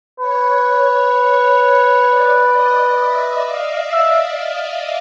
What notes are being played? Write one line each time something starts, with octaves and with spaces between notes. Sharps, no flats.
B4 C#5
D5
D#5
E5
F5
E5